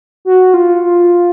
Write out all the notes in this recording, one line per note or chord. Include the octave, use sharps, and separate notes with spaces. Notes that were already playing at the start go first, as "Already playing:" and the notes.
F#4
F4
F4